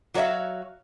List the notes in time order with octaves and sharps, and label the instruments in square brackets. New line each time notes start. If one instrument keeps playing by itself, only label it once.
[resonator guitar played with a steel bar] F#3 F#4 C#5 D5 E5 F5